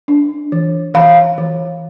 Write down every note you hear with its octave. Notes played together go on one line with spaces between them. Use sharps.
D4
E3
E3 F5
E3